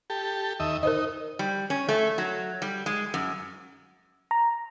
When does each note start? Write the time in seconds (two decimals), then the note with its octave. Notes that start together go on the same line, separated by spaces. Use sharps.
0.10 G4 A4
0.60 D#2 D#5 E5
0.83 D#4 A#4 C5 D#5
1.39 G3
1.70 C#4
1.89 A3
2.18 F#3
2.62 G3
2.86 G#3
3.14 F#2
4.31 A#5